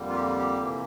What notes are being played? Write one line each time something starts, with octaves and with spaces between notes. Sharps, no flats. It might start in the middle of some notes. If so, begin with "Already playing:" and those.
Already playing: F2 D3 G3 A#3
F4
G4
G4
C3 E3 A#3